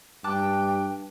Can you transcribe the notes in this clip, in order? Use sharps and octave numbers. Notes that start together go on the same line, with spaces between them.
G2 G5 A5 D6 F#6